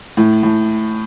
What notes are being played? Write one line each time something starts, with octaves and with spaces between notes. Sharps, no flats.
A2
A2